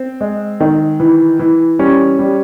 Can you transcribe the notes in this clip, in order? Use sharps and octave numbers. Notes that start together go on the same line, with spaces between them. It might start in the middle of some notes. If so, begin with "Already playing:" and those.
Already playing: C4
G#3
D#3
E3
E3
G3 C#4
G3